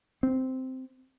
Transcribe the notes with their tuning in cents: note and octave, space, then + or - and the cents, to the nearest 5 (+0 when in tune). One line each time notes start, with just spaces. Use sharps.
C4 -10